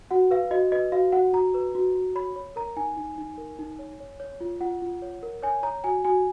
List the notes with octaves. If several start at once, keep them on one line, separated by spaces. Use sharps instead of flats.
F#4 F#5
B4 F5
F#4 D#5
B4 D#5
F#4 F5
F#4 F#5
F#4 A#5
B4
F#4
F#4
C#5 B5
C#5
A#4 A#5
D#4 G#5
D#4
D#4
A#4
D#4
C#5
C#5
C#5
F4
F4 F#5
F4
C#5
A#4
C#5 G#5
C#5 A#5
F#4 G#5
F#4 G#5